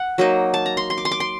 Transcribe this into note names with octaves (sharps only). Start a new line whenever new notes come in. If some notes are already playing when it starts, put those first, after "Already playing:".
Already playing: F#5
F#3 A#3 D#4
A5
A#5
C6
C6
D6
C6
D6
C6